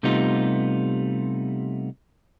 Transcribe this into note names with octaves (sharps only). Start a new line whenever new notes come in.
C3 G3 A3 B3 D#4 F4